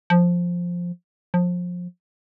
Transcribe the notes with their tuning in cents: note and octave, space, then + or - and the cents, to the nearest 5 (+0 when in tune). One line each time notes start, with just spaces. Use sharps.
F3 +5
F3 +25